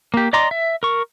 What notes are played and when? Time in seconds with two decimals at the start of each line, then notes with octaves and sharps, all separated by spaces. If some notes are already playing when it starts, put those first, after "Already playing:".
0.14 A#3 G4
0.33 D5 D#5 A#5 C6 D6
0.51 E5
0.83 A#4 C#6